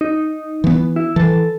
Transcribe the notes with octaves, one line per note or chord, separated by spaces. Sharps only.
D#4
E3 B3
E4
E3 A4